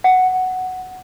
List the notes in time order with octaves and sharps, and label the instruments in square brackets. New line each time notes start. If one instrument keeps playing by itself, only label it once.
[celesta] F#5